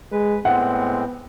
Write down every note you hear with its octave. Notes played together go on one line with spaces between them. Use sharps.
G#3 B4
A2 G#3 B3 C4 F#5